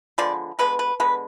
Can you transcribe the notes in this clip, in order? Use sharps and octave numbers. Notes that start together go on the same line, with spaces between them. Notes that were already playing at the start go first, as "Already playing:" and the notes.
D3 F3 G#3 B3 D5
D3 G#3 B3 B4
B4
D3 G#3 B3 B4